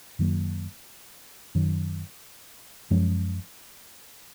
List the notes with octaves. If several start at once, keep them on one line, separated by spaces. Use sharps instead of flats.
F#2 D#3 F#3 A#3
F#2 D#3 F#3 C#4
F#2 F3 G#3 C#4